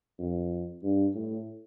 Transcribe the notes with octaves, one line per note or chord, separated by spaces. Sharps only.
F2
G2
A2